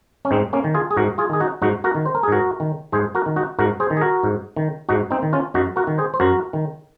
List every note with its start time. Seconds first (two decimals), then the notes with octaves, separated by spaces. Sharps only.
0.25 C#4
0.31 G#2 C4 D#4
0.53 A#3 C#4
0.64 D#3
0.75 F4 G#4
0.91 G#4
0.97 G#2 F#4 A#4
1.18 F4 G#4
1.29 D#3 G#4
1.40 D#4 F#4
1.62 G#2 D#4 F#4
1.84 F#4 A#4
1.95 D#3
2.06 C5
2.15 A#4
2.23 G#4
2.28 G#2 F#4 A#4
2.60 D#3
2.92 G#2 G#4 C5
3.15 F#4 A#4
3.26 D#3
3.36 D#4 F#4
3.59 G#2 F#4 A#4
3.80 G#4 C5
3.90 D#3
3.97 G#4
4.01 F#4 A#4
4.23 G#2
4.56 D#3
4.89 G#2 D#4 F#4
5.11 C4 D#4
5.22 D#3
5.33 C#4 F4
5.54 F#2 D#4 F#4
5.76 F#4 A#4
5.87 D#3
5.98 G#4 C5
6.14 C5
6.20 F#2 F#4 A#4
6.53 D#3